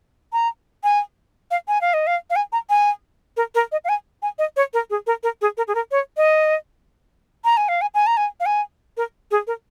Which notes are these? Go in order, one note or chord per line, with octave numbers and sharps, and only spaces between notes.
A#5
G#5
F5
G#5
F5
D#5
F5
F5
G#5
A#5
G#5
A#4
A#4
D#5
F5
G#5
G#5
D#5
C#5
A#4
G#4
A#4
A#4
G#4
A#4
G#4
A#4
C#5
D#5
A#5
G#5
F5
G#5
G#5
A#5
G#5
F5
G#5
A#4
G#4
A#4